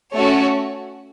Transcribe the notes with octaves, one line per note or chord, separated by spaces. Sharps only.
A3 C#4 F#4 C#5